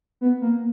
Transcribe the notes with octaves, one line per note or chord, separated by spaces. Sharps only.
B3
A#3